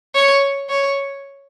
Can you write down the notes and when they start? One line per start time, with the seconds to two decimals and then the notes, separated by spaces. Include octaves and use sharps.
0.15 C#5
0.70 C#5